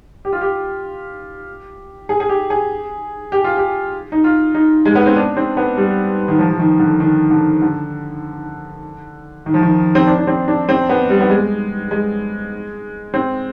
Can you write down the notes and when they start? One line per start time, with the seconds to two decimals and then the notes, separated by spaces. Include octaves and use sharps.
0.25 G4
0.33 F4
0.41 G4
2.09 G#4
2.20 G#4
2.29 G4
2.50 G#4
3.32 G4
3.44 F4
3.57 G4
4.12 D#4
4.24 F4
4.55 D#4
4.85 G#3
4.95 B3
5.06 C4
5.16 D4
5.37 C4
5.57 B3
5.77 G3
6.28 D#3
6.39 F3
6.50 F3
6.59 D#3
6.79 D3
7.00 D#3
7.30 D3
7.62 D3
9.46 D#3
9.54 F3
9.62 D#3
9.95 C4
10.07 D4
10.18 D4
10.27 C4
10.48 D4
10.69 C4
10.89 B3
11.10 G3
11.21 B3
11.30 G#3
11.91 G#3
13.14 C4